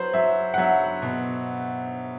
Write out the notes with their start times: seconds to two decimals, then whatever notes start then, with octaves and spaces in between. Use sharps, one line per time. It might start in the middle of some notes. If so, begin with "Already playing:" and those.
Already playing: F#3 B4 C5
0.14 F#3 E5
0.54 F#5
0.58 F#3 E5
1.02 B2